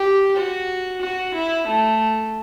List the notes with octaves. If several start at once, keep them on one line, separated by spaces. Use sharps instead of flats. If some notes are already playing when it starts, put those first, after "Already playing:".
Already playing: G4
F#4
F#4
E4
A3